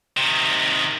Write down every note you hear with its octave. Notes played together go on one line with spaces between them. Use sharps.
C3 D#3